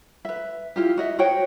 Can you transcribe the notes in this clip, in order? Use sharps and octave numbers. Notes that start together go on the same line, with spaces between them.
B4 E5
E4 F4 G4
F#4 D#5 E5
F#4 C5 C#5 G5